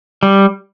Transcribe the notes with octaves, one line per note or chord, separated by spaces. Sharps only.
G3